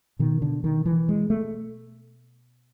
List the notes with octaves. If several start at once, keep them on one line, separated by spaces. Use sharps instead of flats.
B2 D#3
D3
D#3
E3
G#3
A3